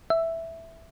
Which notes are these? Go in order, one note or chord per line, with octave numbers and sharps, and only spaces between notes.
E5